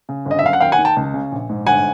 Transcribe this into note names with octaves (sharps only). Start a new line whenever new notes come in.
C#3
G1
D#5
E5
F#2 F5
F#5
D#2 F5 G5
F#5 G#5
D#3
G5 A5
C#2
C#3
A#1
G#2
G1 F#5 G#5